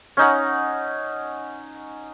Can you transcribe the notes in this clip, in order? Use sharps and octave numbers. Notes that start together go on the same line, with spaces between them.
C#4 D#4 F#5